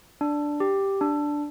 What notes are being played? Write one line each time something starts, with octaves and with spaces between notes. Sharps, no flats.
D4
G4
D4